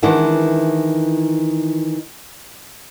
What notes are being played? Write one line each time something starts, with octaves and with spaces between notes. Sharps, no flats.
D#3 E3 G#3 D4 E4 F#4